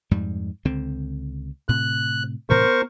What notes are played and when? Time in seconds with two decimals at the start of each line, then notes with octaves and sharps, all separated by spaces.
0.11 F2 G#2 G3
0.65 C#2 D3 C4
1.69 A2 C3 F#6
2.50 A2 C3 E3 A#4 C5 C#6
2.65 B3